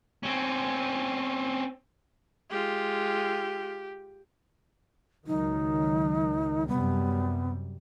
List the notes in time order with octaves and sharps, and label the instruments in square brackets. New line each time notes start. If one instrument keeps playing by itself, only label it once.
[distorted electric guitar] C4 C#4
[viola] G#3 F4 [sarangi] G4
[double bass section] C#2 D#3 F#3 [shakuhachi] D#4
[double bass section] F#2 C3 G3 [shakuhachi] B3